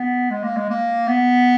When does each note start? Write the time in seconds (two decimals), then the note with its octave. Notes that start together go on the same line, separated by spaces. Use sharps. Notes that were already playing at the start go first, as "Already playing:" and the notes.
Already playing: B3
0.31 G#3
0.44 A#3
0.56 G#3
0.70 A#3
1.08 B3